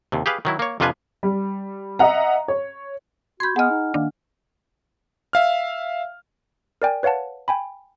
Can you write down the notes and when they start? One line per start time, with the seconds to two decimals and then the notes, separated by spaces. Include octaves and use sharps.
0.12 D#2 C3
0.26 G4 G#4 B4 F5
0.45 D#3 F#3 E4
0.59 A#3 C#5
0.80 F2 C3 D4 F4 B4 G#5
1.23 G3
1.99 D#5 E5 F#5 A#5
2.48 C#5
3.40 F#4 B5 C6 G6 G#6
3.56 B3 G#4 D#5 F#5 G#5 F6
3.70 D#4
3.94 D#3 A#3 D4
5.33 E5 F5 F6
6.82 A#4 D5 G5 G#5
7.03 B4 C#5 F5 F#5 A5
7.48 G5 G#5 B5